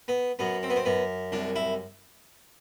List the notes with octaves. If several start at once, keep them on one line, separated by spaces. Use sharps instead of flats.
B3
F#2 B3
C4
B3
C4
F#2 B3
C2 D4
E4